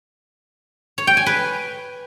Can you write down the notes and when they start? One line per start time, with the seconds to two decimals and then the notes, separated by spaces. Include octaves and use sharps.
0.98 C#5
1.07 G5
1.17 G#5
1.26 B4